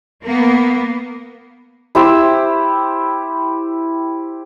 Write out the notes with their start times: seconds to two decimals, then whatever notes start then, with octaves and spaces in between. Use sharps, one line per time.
0.24 A#3 B3
1.95 E4 G4 C5 E6